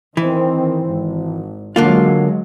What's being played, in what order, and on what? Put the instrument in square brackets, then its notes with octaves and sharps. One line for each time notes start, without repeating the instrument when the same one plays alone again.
[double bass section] D#3 C4 [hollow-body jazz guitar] E3
[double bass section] G#1
[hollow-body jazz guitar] D3 A#3 F4 [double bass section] F#3 G#3